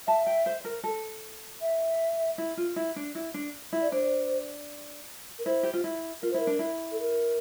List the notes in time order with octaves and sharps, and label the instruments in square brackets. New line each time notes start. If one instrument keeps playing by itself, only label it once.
[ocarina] E5 [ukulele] A5
[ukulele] G5
C5
A#4
A4
[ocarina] E5
[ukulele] E4
F4
E4
D4
E4
D4
E4
[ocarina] D5
[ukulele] D4 [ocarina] C5
[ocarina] A#4
[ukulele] E4 [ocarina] C5
[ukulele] G4
F4
E4
[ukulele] F4 [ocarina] A#4
[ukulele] E4 [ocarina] C5
[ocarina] A#4
[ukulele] D4
E4
[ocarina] A4
A#4